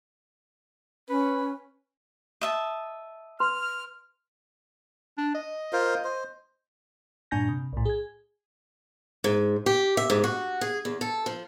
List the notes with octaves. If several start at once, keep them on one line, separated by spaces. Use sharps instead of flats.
C#4 B4
D#5 E5 A5
B4 C6 F6
D4
D#5
F4 A#4 C5
C5
G2 A#2 D4 G#5 G6 A#6
C3
B1 A2
G#4 G#6
G#2
G4
E5
G#2
F#4
G#4
E2
A4
F3